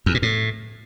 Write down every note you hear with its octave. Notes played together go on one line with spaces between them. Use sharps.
E2
A#2
A2